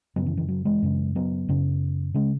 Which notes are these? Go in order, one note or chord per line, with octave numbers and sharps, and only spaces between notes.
F#2 C#3 F#3 B3
E3
E3
F#3
E3 G#3
F#2 C#3
F#3 B3
F#2 C#3
C#3 G#3 C#4